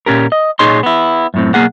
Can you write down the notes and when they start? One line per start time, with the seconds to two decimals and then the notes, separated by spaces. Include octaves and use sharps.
0.06 A#2 C#4 G4 A#4
0.32 D#5
0.59 A#2 D#4 G#4 C#5 D#5 C6
0.83 B3 E4
1.34 F#2 A2 C4
1.54 B1 E3 A#3 G#4 F#5